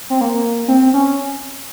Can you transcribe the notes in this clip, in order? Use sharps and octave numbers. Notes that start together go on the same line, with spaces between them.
C4
A#3
C4
C#4